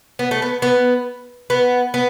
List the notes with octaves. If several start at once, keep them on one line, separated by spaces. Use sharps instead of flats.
B3
A3
B3
B3
B3
B3